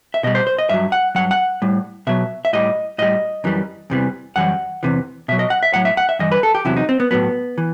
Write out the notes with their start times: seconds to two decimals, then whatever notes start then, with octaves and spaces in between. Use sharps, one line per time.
0.14 E5
0.23 B2 D#5
0.27 G3
0.35 C5
0.47 C5
0.58 D#5
0.69 G2 F#3 E5
0.92 F#5
1.15 G2 F#3 F#5
1.31 F#5
1.62 A2 G3
2.07 B2 F#3 E5
2.45 E5
2.53 A2 G3 D#5
2.98 A2 G3 D#5
3.44 F#2 E3 G3
3.90 E2 C3 E3 G3
4.36 F#2 E3 G3 F#5
4.83 E2 C3 E3
5.28 B2 E5
5.32 F#3
5.39 D#5
5.50 F#5
5.63 E5
5.74 A2 F#3 F#5
5.85 E5
5.97 F#5
6.09 E5
6.19 G2 E3 G3 D#5
6.32 B4
6.43 A4
6.55 G4
6.65 E2 C3 F#3 E4
6.77 D#4
6.89 C4
7.00 B3
7.11 A2 F#3 B3
7.58 E3